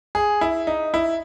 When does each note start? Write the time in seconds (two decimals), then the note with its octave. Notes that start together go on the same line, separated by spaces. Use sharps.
0.15 G#4
0.41 E4
0.67 D#4
0.94 E4